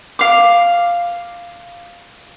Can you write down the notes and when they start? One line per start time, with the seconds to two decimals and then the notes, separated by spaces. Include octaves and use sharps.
0.19 F5 D6